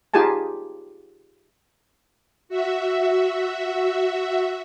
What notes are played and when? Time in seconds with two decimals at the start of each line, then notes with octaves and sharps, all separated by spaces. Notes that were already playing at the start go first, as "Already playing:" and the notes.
0.14 D#4 F4 G4 G#4 G#5 A5
2.49 F#4 E5